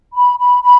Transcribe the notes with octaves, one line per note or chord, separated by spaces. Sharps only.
B5
B5
B5